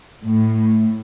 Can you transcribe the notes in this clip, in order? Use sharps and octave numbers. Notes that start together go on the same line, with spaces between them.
A2